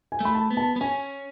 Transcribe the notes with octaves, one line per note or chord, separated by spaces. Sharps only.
G#5
A3 B5
A5
B3
A5
B3
C#4 G#5